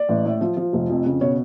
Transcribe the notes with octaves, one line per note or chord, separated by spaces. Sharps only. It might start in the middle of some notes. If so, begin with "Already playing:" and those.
Already playing: D5
A1
A2
F3
F3
F1
F2
C#3
B2 C#5